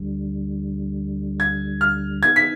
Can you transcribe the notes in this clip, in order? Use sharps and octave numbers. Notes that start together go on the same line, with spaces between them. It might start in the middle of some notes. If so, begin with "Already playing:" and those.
Already playing: D2 D3 G3
G#6
F6
D#3 B3 D#4 G#4 G#6
B6